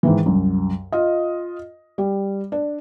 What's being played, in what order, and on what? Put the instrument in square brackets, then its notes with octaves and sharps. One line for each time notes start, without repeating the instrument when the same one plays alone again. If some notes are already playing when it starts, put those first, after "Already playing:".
[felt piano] G#2 D#3 E3
C2 F#2
F4 D#5
G3
D4